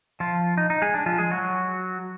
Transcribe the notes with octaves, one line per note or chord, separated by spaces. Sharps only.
F3 F4
D#4
D#4
G#3 G#4
D4
F3 F4
G#3 G#4
F#3 F#4